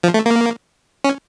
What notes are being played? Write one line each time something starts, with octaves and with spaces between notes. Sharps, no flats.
F3
A3
A#3
C#4